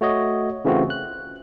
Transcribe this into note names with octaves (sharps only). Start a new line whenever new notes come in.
A3 F#4 C#5 D#5
C#3 E3 A3 C4 F4 F#4
F#6